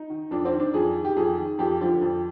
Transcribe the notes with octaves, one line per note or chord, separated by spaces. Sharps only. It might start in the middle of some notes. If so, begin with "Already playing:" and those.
Already playing: D#4
D#3
F2 D4
C4
D#3
D4
F2 G#4
D#3
G4
F2 G#4
D#3
F2 G4
D3 F3
F2